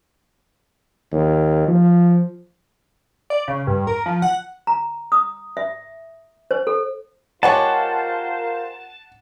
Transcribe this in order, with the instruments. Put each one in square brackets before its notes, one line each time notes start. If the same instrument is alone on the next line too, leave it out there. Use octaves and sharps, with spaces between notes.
[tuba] D#2
F3
[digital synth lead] D5
C#3
G2
A#4
F3
F#5
[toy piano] A#5
D#6
E5
C5
A4
[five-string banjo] G#3 G4 C#5 [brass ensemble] F4 A#4 C5 [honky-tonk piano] F#5 [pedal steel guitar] A5